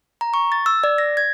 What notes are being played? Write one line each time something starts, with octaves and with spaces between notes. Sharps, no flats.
A#5
C#6
A6
E6
D5
A#6
G#6